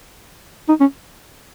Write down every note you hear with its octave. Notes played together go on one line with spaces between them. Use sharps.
D#4
C#4